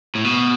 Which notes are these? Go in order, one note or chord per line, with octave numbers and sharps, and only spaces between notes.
A2
B2